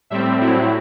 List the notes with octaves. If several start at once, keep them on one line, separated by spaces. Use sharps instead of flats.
A2 G3 C4 E5
A2 F#3 C4 E4